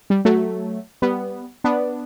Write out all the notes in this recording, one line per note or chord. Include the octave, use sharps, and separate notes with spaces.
G3
F#3 A3
G3 B3
B3 D4